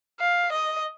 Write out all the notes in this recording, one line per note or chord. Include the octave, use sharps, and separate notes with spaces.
F5
D#5